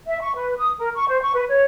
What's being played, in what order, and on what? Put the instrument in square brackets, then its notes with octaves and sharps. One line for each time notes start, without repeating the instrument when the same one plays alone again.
[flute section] E5
C#6
B4
D#6
A#4
C#6
C5
C#6
B4
C#5